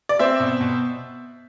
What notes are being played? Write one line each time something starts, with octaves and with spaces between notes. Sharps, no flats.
D5
C4 C5 E5
B2
B2